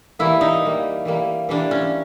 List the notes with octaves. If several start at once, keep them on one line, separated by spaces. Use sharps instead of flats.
E3 G3 A#3 E4
D#4
E3 G3 A#3
E3 G3 A#3
E3 G3 A#3 D4
C#4